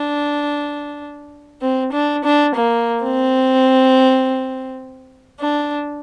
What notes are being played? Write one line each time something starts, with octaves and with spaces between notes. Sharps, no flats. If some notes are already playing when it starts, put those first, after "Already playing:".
Already playing: D4
C4
D4
D4
A#3
C4
D4